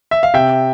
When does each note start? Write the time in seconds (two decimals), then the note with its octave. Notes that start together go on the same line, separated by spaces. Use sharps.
0.11 E5
0.23 F5
0.34 C3 E5 G5